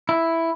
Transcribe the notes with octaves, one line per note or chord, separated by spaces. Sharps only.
E4